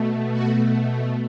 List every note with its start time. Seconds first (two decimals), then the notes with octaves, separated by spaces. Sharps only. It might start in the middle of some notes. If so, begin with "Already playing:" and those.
Already playing: B2 A3
0.31 F#4